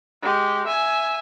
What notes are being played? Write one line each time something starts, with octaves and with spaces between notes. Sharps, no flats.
G#3 G4
E5 G#5